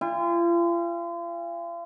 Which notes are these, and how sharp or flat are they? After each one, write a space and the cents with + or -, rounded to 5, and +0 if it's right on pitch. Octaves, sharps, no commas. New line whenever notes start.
F4 -40 G#5 -45